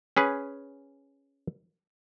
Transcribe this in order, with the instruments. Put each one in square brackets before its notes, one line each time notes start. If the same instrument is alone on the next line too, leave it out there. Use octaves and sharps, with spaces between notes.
[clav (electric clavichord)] C#4 G#4 B4